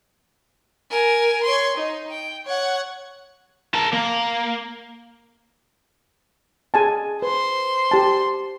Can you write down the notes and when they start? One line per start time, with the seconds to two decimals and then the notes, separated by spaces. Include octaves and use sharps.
0.90 A#4 G#5
1.44 C#5 C6
1.76 D#4
2.10 G5
2.46 C#5 F#5
3.75 A#4 A5
3.94 A#3
6.74 G#4 G#5 A5
7.22 B4 C5 C6
7.91 G4 A5